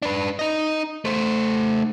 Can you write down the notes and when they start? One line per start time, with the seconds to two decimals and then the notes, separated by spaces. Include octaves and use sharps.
0.02 D4 B4
0.39 D#4 D#5
1.05 A3 C5